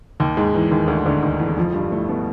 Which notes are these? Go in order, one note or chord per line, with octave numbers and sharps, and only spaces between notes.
D#2 D#3
G#2 G#3
E2 E3
D#2 D#3
D2 D3
D2 D3
D#2 D#3
E2 E3
F2 F3
G2 G3
A2 A3
B2 B3